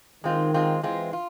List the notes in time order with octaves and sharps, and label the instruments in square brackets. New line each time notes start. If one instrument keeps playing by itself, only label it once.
[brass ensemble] D#3 [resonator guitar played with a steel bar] G#3 C4 F4
[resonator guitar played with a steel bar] G#3 C4 F4
[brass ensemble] E3 [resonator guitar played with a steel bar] G#3 C4 F4
[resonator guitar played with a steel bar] F4